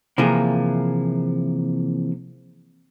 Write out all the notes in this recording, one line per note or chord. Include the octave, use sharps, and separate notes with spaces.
C3 E3 F3 A#3 G#4 A#4